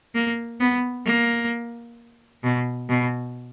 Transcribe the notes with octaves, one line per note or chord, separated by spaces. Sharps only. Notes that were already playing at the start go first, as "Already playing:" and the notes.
A#3
B3
A#3
B2
B2